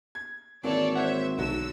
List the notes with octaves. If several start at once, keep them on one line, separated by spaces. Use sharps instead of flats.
G#6
G#1 E3 A#3 A4 C#5 D5
C5 C#5 E5 F#5
B1 D3 F#3 E6